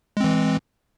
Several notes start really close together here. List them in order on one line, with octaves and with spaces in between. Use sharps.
G#3 C4 E3